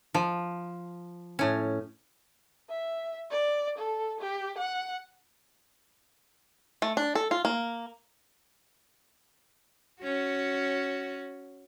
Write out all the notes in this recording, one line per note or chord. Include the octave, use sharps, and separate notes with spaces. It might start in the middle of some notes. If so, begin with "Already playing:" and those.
F3
A2 C#4
E5
D5
A4
G4
F#5
A3
D4
A4
F4
A#3
C#4 F#4